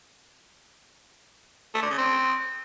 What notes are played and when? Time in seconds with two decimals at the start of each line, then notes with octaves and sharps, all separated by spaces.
1.75 A3
1.82 D3
1.90 C#3
1.98 C4